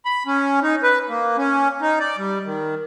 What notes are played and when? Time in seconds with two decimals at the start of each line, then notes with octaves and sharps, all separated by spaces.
0.05 B5
0.27 C#4
0.63 D#4
0.83 B4
1.09 A#3
1.38 C#4
1.81 D#4
2.00 D5
2.18 G3
2.46 D#3